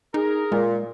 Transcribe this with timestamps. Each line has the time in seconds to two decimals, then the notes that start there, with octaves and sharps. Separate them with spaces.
0.14 D#4 G#4 A#4
0.52 A#2 G#3